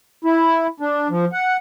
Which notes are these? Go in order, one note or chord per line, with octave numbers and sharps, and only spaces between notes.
E4
D4
F3
F#5